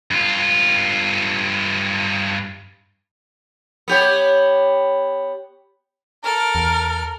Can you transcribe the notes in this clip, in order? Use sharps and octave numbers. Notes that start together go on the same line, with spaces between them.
G2 F4
B3 G4 C#5
A4 A#4 F6
E2